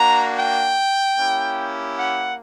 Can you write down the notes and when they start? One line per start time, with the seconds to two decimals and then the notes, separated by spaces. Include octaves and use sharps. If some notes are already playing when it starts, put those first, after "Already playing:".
Already playing: A#3 D4 F#4 A#5
0.37 G5
1.17 A#3 C#4 E4 G4
1.97 F#5